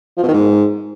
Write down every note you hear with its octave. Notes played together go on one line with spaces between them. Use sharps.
F3
B2
D#3
G#2